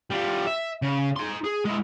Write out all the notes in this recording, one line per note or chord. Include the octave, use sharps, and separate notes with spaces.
G3 F4
E5
C#3
D#4 C6
G#4
G#3 E4